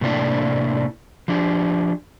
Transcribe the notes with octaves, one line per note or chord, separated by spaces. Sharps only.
A2 C3 A3 A#3 D4 E4
F3 D4 G4